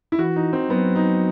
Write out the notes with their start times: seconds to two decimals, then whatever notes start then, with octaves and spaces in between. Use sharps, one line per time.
0.12 E4
0.19 E3 F#4
0.36 D#4
0.53 C4
0.69 F#3 B3
0.95 D#4